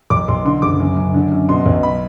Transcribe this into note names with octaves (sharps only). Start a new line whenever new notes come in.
B1 D6
B1 C6
D3 C6
F#1 D6
F#2
F#2
D3
F#2
B2 C6
B1
B5